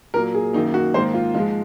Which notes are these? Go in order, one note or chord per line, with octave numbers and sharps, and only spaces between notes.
A#2 F#3 A#3 A#4
G#4
F#2 D#3 A#3 D#4
F#4
G#2 D#3 A#3 C5
F4
G#2 F3 G#3 F4